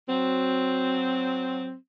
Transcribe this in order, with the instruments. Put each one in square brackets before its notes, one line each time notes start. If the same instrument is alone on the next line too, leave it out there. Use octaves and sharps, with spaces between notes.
[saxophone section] F#3 C4